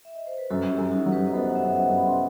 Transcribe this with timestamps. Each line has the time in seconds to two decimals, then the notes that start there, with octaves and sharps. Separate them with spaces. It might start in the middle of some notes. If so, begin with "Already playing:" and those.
0.05 E5
0.15 D#5
0.27 C5
0.38 B4
0.50 F#2 F#4 A4
0.62 F#4
0.71 E4 G4
0.78 F#2
0.92 D#4 F#4
1.06 F#3
1.12 G4 B4
1.26 D#5
1.33 B3 A4 C5
1.49 F#5
1.55 C5 E5
1.63 F#2
1.76 D#5 F#5
1.89 F#2
1.97 B5
2.07 C6